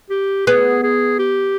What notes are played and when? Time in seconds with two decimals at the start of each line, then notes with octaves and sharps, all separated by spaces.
0.10 G4
0.47 B3 G#4
0.83 G#4
1.19 G4